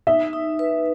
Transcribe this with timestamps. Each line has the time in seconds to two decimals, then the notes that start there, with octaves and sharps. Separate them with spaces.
0.07 D#4 E5
0.33 D#4
0.59 B4